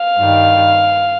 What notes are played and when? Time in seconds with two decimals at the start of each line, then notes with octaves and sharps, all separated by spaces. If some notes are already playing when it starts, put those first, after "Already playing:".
Already playing: F5
0.17 G2 D#3 G3